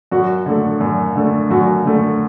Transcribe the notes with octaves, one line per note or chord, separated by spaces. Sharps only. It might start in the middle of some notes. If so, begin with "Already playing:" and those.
F#2 F#4
D3 A3
F#2
D3 A3
F#2 F#4
D3 A3